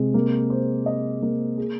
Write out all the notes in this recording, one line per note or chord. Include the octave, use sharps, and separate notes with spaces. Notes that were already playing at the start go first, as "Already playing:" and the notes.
Already playing: C3 G#3
A#3
C5
D#5
A#3
G#4